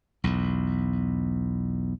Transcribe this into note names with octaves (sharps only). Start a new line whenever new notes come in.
B1 E2